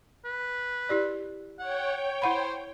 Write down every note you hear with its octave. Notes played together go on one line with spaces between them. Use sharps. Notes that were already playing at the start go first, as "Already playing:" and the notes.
B4
E4 G4 D5
C#5 F#5 G5
E4 C5 F#5 B5